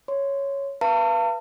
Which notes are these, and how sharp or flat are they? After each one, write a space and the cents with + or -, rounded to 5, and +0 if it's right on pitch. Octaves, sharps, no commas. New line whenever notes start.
C#5 +0 C6 -15
B4 -15 F5 -40 A5 +45